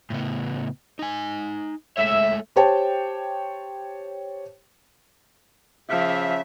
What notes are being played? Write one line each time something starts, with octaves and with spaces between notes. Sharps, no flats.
A2 C#3 B3
D#4 G#5
G#3 A3 C#5 E5
G4 C5 C#5 G5 A5
C#3 F3 E5